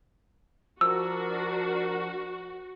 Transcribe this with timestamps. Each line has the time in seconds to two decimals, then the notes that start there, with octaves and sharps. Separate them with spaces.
0.81 F3 D4 F#4 A#4 E6